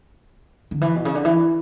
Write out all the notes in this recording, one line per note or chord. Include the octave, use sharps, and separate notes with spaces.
D3
E3
B2
C#3
D3
E3